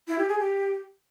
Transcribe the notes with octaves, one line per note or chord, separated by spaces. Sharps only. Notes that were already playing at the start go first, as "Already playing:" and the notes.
E4
G4
G#4
G4